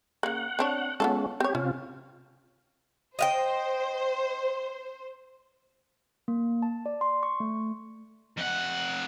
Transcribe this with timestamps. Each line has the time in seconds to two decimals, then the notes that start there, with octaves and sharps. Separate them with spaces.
0.23 C#3 A#3 F#5
0.59 C4 D4 C#5
1.00 G#3 B3 C#4 F4 A4
1.40 C4 G4 C#5
1.55 C3 C#4 F4
3.19 C5 D#5 F5 G5
6.28 A#3
6.62 A5
6.86 D5
7.01 C6
7.23 C#6
7.40 A3
8.38 F2 F#5